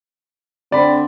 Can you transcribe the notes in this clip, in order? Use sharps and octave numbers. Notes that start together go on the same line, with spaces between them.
D3 C4 D5 B5